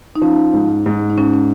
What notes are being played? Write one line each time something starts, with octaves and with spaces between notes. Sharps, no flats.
D#4
F3 C#4
G#2
G#2
D#4
G#2 C#4
C#4